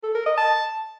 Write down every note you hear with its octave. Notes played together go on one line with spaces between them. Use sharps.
A4
A#4
D#5
A5